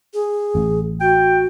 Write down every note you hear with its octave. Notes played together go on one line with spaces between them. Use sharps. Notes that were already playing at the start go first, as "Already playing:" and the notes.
G#4
A1
F#4 G5